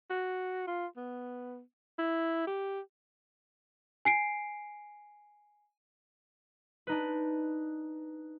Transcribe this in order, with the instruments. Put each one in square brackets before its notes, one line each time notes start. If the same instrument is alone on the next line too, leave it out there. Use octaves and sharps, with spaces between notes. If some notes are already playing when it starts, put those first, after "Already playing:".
[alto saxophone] F#4
F4
B3
E4
G4
[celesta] G#5 C7 D7
[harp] D4 D#4 B4